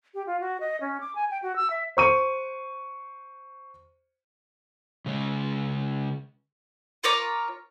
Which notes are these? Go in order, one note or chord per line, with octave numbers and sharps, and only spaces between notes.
G4
F4
F#4
D#5
C#4
D6
G#5
G5
F#4
E6
E5
C5 C#6 D#7
C#3 G#3
F4 A#4 C#5 D6